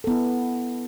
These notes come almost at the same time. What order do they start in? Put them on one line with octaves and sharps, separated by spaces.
A4 B3 E4